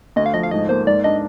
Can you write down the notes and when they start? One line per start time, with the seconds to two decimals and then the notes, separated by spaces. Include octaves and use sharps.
0.16 D2 D#5
0.26 F5
0.34 F3 D#5
0.43 F5
0.51 G#2 D#5
0.69 A#3 C5
0.87 G#2 D5
1.04 D4 D#5